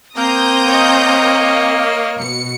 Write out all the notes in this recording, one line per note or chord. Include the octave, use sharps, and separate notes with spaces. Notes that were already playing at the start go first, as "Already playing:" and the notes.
A#3 C4 A#5 D#6 G6
C#5 D#5
B2 C#7